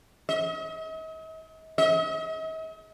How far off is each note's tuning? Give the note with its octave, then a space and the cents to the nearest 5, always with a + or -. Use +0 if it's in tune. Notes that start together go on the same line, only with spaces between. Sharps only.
D#5 +45
D#5 +45